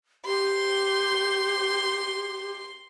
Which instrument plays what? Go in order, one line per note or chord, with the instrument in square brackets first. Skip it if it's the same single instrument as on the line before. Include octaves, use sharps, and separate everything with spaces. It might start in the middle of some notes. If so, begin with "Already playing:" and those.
[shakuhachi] G4 [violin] C6